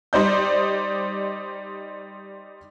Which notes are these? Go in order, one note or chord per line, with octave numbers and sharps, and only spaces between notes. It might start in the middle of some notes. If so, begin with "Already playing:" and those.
G3 D#4 C5 D5 G6